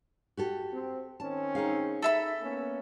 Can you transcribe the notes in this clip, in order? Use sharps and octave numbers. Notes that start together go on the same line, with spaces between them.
F#4 G4 A4
C4
D#3 C4 C#4 A5
D#4 G#4 F5
A4 E5 B5
A#3 B3 C#4